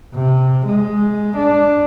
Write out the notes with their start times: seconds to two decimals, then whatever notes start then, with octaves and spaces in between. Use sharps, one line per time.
0.14 C3
0.66 G#3
1.36 D4